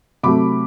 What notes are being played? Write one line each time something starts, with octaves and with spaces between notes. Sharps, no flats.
C3 F#3 A3 B5 D6